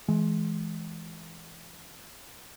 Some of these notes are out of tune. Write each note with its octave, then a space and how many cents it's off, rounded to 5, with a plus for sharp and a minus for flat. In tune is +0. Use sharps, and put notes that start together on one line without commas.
E3 +0 G#3 +25